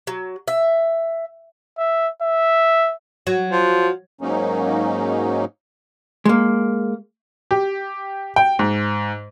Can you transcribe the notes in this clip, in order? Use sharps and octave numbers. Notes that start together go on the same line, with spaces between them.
F#3
E5
E5
E5
F#3
F3
G#2 F#3 A#3 C#4 D#4
G#3 A#3
G4
G5
G#2